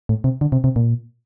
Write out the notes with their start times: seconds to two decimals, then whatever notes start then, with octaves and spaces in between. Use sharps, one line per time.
0.09 A2
0.24 C3
0.41 D3
0.52 C3
0.64 C3
0.76 A#2